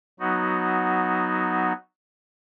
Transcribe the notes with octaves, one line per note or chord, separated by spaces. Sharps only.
F#3 B3 D#4 F#4